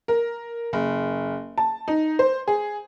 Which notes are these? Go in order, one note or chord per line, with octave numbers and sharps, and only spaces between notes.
A#4
F#1
A5
D#4
C5
G#4